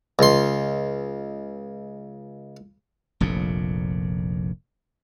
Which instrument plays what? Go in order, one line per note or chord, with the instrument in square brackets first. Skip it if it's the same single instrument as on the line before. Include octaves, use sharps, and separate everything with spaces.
[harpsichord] C#2 C6
[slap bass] F1 A#1 F2 A#2